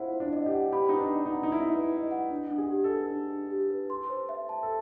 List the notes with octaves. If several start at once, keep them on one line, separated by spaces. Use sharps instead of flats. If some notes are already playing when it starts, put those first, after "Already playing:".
Already playing: E4 F4 C5 F#5
C5
D4
D#5
G4
F#5
G4 B5
D#4 B4
D4
D#5
D#4
F#5
D#4
E4 B5
B4
D#5
F#5
D4
D4
G#4
G4
A4
B4
D4
D4
G4
B4
C6
C5
E5
A5
A4